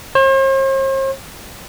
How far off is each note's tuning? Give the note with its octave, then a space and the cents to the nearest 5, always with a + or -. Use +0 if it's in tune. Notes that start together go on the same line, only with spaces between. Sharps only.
C5 +45